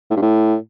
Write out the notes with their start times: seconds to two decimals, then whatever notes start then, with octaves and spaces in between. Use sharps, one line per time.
0.11 A2
0.16 G2
0.22 A2